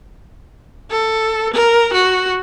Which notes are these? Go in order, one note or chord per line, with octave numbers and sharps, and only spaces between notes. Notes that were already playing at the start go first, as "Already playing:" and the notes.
A4
A#4
F#4